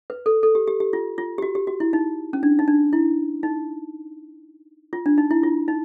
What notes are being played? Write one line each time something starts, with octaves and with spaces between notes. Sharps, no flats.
B4
A4
A4
G4
G4
G4
F4
F4
G4
F#4
G4
F#4
E4
D#4
C#4
D4
D#4
D4
E4
D#4
F4
D4
D#4
E4
F4
D#4